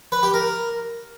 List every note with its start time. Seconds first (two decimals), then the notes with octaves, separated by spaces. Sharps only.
0.12 B4
0.23 G4
0.34 A#4